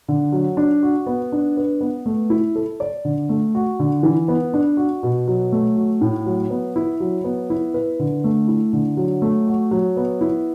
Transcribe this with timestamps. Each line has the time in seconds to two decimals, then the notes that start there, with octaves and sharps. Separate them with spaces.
0.08 D3
0.32 F#3
0.57 D4
0.83 F#4
1.06 B3
1.32 D4
1.57 B4
1.81 B3
2.06 A3
2.30 E4
2.55 A4
2.80 D5
3.05 D3
3.29 A3
3.55 F#4
3.79 D3
4.03 E3
4.28 B3
4.54 D4
4.77 F#4
5.03 B2
5.28 F#3
5.52 A3
5.76 F#4
6.01 A2
6.26 F#3
6.50 B3
6.76 E4
7.00 F#3
7.24 B3
7.50 E4
7.74 B4
7.99 D3
8.24 A3
8.48 E4
8.73 D3
8.97 F#3
9.22 A3
9.47 F#4
9.71 F#3
9.97 B3
10.21 E4